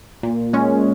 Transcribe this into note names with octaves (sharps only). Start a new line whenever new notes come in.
A#2
G#3 C#4